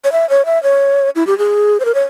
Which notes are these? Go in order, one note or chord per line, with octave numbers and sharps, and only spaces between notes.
C#5
E5
C#5
E5
C#5
E4
G4
G#4
C5
A#4
C#5